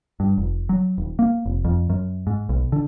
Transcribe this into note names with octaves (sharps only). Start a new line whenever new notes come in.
G2
F1
F#3
D#1
A#3
F1
F2
F#2
G#2
B1
D3